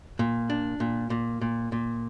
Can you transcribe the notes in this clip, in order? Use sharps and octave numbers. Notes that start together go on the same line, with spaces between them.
A#2
D4
A#2
A#2
A#2
A#2